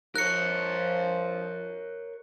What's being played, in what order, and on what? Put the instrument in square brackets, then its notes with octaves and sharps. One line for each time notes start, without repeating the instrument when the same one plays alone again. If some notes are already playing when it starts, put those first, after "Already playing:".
[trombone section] F3 [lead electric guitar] A#4 C#5 [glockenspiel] F#6 C#7